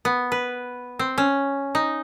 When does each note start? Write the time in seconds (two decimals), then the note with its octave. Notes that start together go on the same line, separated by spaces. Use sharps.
0.05 B3
0.32 B4
0.99 C4
1.18 C#4
1.75 D#4